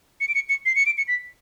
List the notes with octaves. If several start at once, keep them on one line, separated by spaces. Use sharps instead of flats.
C#7
D7
C#7
C#7
C7
C#7
D7
C#7
B6